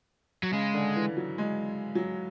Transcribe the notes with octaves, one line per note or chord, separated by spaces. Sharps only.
F#3
C#3 G#3
D3
E3
F#3
G#3
F#3